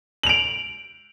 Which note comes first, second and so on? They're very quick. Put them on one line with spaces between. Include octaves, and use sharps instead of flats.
F#7 F7 D7